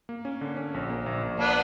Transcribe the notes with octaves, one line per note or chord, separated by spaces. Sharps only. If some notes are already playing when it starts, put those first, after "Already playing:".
A#3
C#4
D3
C#4
A#1
A#3
A#1
A#1
A#3 B3 D4